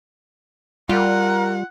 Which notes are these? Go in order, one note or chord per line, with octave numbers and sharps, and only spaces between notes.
G3 F4 A#4 F#5